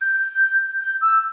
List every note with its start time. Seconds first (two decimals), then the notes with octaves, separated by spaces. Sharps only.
0.01 G6
0.81 G6
1.01 E6